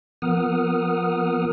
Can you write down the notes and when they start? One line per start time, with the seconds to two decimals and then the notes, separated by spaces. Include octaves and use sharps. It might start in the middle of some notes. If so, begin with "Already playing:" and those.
0.22 F3 B3 A#4 F#5 D#6 F6